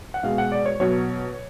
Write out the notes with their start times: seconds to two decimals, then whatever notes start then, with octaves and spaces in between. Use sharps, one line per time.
0.14 F#5
0.23 B2 G#3 F5
0.38 F#5
0.52 D5
0.66 C#5
0.80 B2 F#3 C#5